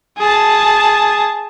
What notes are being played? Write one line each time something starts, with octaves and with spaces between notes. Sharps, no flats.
G#4 A5